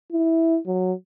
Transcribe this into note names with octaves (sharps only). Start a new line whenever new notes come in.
E4
F#3